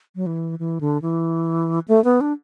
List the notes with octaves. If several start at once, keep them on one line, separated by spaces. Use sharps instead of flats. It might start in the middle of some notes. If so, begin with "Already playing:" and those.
F#3
E3
E3
D3
E3
A3
B3
D4